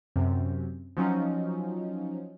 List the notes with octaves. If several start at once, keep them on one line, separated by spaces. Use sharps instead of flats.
F#2 C3
F3 F#3 C#4 D#4